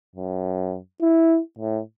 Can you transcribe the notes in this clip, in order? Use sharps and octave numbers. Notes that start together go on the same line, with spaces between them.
F#2
E4
A2